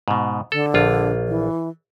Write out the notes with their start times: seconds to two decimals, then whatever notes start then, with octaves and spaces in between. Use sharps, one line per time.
0.08 G#2 B2
0.52 D3 A4
0.74 A#1 F4
1.28 E3